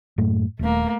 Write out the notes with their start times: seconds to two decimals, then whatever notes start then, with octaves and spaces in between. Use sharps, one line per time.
0.18 F#2 A2 A3
0.59 D#1 A3 A#3